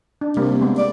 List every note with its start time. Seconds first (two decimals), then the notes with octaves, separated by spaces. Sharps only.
0.21 D4
0.37 C3 G3 A#3
0.61 G#3 B3
0.77 D5